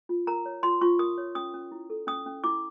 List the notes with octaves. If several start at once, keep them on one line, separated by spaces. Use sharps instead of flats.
F4
A#4 A#5
C#5
F4 C6
F4 C#6
A#4 D#6
C#5
C#4 D#6
C#4
E4
A4
C#4 D#6
C#4
E4 D6